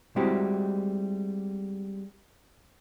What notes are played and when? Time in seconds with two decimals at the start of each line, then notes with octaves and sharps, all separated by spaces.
0.16 G3 G#3 C4 E4 F#4 G4